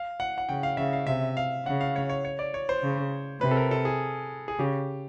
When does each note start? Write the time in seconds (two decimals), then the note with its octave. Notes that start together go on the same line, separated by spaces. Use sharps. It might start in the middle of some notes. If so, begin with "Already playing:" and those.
Already playing: F5
0.20 F#5
0.38 F#5
0.49 C#3 G5
0.63 F5
0.77 C#3 E5
0.93 F5
1.07 C3 E5
1.37 F5
1.66 C#3 F#5
1.81 F5
1.96 C#5
2.09 C#5
2.25 C#5
2.39 D5
2.54 C#5
2.69 C5
2.83 C#3
3.41 C3 B4
3.51 A4
3.57 A#4
3.71 A4
3.85 G#4
4.48 G#4
4.59 C#3 G4